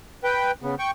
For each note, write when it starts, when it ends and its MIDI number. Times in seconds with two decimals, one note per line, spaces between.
0.24 0.51 71
0.24 0.51 79
0.62 0.75 49
0.62 0.75 59
0.79 0.91 79
0.79 0.91 85